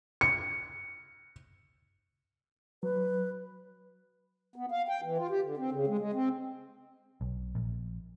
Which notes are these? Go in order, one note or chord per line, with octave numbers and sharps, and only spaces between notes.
C#7
F#3 B4
B3
F5
G5
E3
F4
G4
D3
C4
C#3
G#3
G#3
C4
B1
A#1